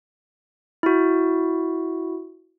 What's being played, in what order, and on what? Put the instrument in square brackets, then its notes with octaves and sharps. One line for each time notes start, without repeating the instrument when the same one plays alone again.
[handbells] E4 F#4